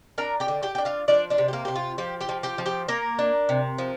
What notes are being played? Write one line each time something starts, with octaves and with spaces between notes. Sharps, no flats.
D4 A#4 A#5
G4 G5
D3
G4 G5
D4 G5
F4 F5
F3 D4 D5
D4 D5
C3
G4
A#3 A#4
C3 G4
F4
F3 G4
G4 G5
F3
G4 G5
F3
G4 G5
A#3 A#4 A#5
D4
C3
F3